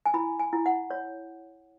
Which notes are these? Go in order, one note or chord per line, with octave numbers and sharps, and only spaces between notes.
G#5
E4 B5
G#5
E4
F#5
C#5